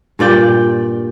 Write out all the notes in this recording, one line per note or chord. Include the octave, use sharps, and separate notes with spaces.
G2 A#2 D5 G5